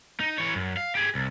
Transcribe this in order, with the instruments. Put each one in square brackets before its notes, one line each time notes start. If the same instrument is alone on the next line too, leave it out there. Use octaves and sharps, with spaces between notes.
[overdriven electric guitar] D#4
E3 C#5
F#2
F5
G4 G#4
C2